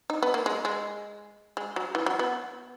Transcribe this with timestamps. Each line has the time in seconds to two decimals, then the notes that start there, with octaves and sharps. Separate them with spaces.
0.10 D#4
0.23 B3
0.34 A#3
0.46 G#3
0.65 G#3
1.57 G#3
1.76 F#3
1.95 E3
2.06 F#3
2.19 B3